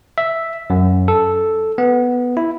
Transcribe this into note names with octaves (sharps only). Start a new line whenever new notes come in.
E5
F#2
A4
B3
E4